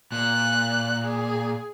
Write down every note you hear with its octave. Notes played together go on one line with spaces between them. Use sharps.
A#2 F#6
G#4